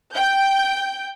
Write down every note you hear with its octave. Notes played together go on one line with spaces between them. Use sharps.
G5 G6